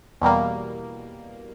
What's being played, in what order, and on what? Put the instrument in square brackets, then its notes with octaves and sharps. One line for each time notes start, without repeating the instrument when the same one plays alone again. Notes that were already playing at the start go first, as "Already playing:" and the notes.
[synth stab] E2 B2 G3 A#3